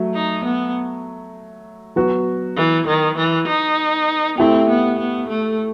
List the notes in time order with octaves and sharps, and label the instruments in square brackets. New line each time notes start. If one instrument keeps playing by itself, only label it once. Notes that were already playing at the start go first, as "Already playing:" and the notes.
Already playing: [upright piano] F#3 A3
[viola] D#4
B3
[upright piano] F#3 B3 F#4
[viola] E3
D#3
E3
D#4
[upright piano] A3 E4 G4 [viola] C4
[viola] B3
B3
A3